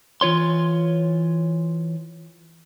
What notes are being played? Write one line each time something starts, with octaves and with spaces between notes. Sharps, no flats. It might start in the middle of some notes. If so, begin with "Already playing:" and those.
E3 F4 C#5 C6